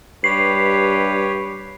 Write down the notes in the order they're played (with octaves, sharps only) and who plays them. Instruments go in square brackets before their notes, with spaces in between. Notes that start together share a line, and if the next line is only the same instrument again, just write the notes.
[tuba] G2 [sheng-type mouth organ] G4 B4 C#5 [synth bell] C7